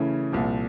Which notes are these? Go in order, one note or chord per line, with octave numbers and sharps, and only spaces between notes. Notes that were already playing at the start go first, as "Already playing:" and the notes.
Already playing: C#3 E3 A3 C#4 E4
C2 A#2 F3